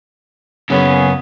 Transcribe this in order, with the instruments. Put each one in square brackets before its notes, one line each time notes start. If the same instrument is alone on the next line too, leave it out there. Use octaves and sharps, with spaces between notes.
[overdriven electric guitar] F#2 C#3 [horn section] B3 C#4 G#4